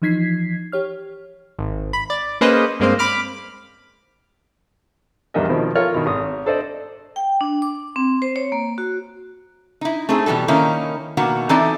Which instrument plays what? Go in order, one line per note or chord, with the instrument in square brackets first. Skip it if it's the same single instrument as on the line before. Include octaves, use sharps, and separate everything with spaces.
[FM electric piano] E3 F3 D#4 G#6 B6 C7
G4 C#5 F6
[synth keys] G#1
B5
D5
A#3 C#4 G#4 B4 C5 D#5
G2 G#3 A#3 C4 C5
B5 D6 F6
[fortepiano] A#1 E2 G3 A#4 D#5 E5
B2 D#3 F3 C4
F4 A4 A#4 C#5 F6
B2 D#3
G#1 D#6
D4 A4 C5 D5 D#5
[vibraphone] G5
D4
D6
C4
C5
C#5
A#3
F#4
[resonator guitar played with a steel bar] D#4 E4
A3 C4 D#4 G#4
B2 E3 F#3 G3 A4
D#3 A#3 C#4 D#4 E4
B2 D#3 A#3 F#4
E3 C4 D#4 E4 A4 D5